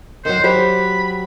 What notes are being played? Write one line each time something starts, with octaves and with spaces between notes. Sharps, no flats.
D#3 F#3 C5
F#3 G4 C5 B5